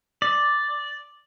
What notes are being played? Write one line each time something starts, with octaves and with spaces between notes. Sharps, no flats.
D5